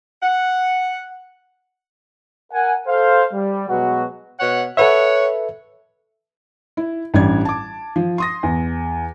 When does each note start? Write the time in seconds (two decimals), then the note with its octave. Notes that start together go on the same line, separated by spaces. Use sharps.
0.23 F#5
2.53 A#4 F#5 G#5
2.87 A4 C5 F5
3.34 G3
3.68 B2 F#3 G#3 B3 F#4
4.39 B2 C#5 F#5
4.77 A4 B4 C#5 E5 F#5
6.77 E4
7.14 A1 G3 D4 G#6
7.45 A5 D6
7.96 F3
8.18 C6 D#6 A#6
8.43 E2